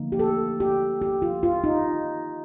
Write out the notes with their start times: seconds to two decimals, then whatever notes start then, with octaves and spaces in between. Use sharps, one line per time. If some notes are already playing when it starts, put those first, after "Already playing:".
Already playing: D3 F3 A#3 D#4
0.12 G4
0.19 A4
0.60 G4
1.02 G4
1.22 F4
1.43 F4
1.64 D#4